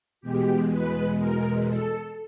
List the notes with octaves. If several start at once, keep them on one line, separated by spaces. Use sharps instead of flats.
E2 B2 G#3 G4
B4
A#4
A4